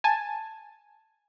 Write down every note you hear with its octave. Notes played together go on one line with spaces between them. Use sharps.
G#5 A5